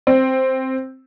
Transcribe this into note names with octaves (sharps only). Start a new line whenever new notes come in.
C4